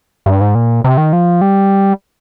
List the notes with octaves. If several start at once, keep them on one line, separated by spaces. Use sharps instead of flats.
G2
G#2
A#2
C3
D#3
F3
G3